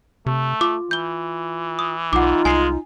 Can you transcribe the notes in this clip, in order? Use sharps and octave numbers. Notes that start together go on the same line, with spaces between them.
C3 A3
F4 D6
E3 G6 G7
D#6
B1 D#4 F4 F#5 D6
C2 G#3 G#5 C7